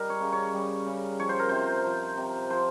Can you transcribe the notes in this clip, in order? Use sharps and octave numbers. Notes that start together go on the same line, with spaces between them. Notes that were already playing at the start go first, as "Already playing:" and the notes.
Already playing: G3 D#4 A#4
C#5
C#3
C#5
G3
C#3
F3 C#5
C5
A#4
C3 C5
F3
C3
F3 C5